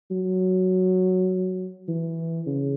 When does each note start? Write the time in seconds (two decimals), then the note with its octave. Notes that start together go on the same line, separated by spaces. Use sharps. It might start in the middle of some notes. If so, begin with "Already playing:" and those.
0.11 F#3
1.88 E3
2.47 C#3